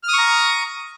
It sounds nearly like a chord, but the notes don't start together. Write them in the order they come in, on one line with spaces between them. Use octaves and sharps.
F6 D#6 C#6 A#5